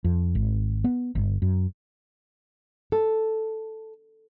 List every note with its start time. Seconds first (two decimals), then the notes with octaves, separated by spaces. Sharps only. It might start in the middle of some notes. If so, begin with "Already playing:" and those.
0.04 F2
0.35 G#1
0.84 B3
1.15 G1
1.42 F#2
2.92 A4